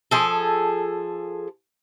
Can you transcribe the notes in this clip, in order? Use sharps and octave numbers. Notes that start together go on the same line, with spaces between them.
F3 G#4 A4